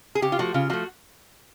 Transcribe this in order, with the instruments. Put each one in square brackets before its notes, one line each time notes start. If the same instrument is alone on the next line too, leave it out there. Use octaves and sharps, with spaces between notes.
[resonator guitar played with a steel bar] G#4
C#3 G4
F4
F3 A3 F#4
C#3 F4
F3 A3 F#4